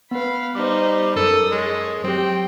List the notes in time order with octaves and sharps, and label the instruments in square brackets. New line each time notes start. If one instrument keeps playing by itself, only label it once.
[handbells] B3 B4 [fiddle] F5 B5
[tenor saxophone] G3 [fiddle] D#4 C5 [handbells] D6
[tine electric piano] F#2 A#4 [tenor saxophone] A4 [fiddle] D#6
[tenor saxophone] G#3 [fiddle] C#5
[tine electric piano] F#3 G4 [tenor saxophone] C4 [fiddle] G5